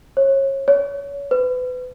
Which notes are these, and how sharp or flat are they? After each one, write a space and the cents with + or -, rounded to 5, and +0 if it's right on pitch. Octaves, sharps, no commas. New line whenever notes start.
C#5 -30
C#5 +25
B4 +30